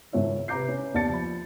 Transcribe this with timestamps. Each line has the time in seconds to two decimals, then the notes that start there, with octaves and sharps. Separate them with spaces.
0.13 G#1 C#2 G#2 C#5 E5
0.48 C3 B4 A#5 D6 G6 C7
0.68 C#4
0.94 D#2 B3 D5 A5 A6 C#7
1.09 F3 B5